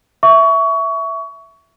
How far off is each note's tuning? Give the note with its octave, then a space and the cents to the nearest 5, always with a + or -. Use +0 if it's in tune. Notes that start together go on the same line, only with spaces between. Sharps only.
E5 +0 C#6 +25